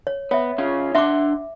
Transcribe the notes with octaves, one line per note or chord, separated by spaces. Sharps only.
C#5
B3 C#5 E5
C#3 C#4 F4
D4 E5 F#5 C6 D6